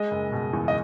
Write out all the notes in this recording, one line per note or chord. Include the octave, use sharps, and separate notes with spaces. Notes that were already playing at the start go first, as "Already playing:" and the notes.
Already playing: G#3 D#5
F#1
B2
E2
D#5